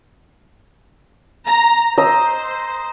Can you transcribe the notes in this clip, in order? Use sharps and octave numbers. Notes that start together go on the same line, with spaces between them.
A#5
C5 D#5 A#5 E6